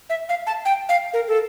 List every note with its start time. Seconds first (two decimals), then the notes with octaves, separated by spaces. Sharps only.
0.10 E5
0.29 F5
0.47 A5
0.65 G5
0.89 F5
1.13 A#4
1.28 A4